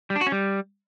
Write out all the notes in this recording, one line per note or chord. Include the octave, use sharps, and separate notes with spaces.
G3
D4
F#4
C#4
G3